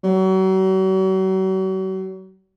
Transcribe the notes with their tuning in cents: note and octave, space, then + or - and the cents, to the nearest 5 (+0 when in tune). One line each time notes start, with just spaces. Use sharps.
F#3 +40